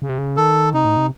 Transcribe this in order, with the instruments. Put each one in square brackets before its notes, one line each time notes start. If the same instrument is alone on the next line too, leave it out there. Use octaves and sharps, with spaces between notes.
[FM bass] C#3
C3
C#3
[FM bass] D#3 [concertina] A4
[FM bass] C3 [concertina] D#4
[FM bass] A2
C3